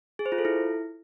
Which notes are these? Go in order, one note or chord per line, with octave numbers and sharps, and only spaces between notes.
G#4
C5
F4
A4
E4